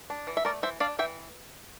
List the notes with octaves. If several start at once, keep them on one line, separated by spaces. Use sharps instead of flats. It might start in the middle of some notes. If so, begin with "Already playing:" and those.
D4
E3
E5
A3 A#4 D5
E3 C5 E5
D4 D5 F5
E3 E5 G5